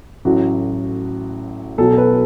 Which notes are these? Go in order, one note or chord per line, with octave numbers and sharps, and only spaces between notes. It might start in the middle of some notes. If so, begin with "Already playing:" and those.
A1 A2 F#3 F#4
B1 B2 F#3 A4
A4
B4